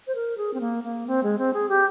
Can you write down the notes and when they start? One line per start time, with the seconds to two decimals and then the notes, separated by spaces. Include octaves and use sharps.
0.07 C5
0.15 A#4
0.38 G#4
0.54 C4
0.61 A#3
0.84 A#3
1.07 C4
1.23 G#3
1.38 C4
1.54 G#4
1.69 G4